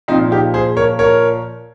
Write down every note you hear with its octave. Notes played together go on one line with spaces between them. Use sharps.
A#2 F3 C4 D#4
D#4 G4
G#4 C5
A#4 C#5
A#4 C#5